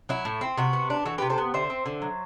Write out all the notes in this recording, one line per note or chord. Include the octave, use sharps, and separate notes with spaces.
F#3 E4
A2
C4
C3 F#4
B3
D4
E3 F#4 A4
G4 B4
C3
A4 C5
B3
D3 C5 E5
C4
D3
F#3